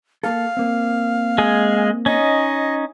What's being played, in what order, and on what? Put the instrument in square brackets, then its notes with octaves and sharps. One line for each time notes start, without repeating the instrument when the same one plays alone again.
[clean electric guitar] A#3 A4 [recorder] F5
[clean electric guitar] A#3 C4
[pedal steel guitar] G#3 G#4
[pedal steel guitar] C#4 D#4 [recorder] D#5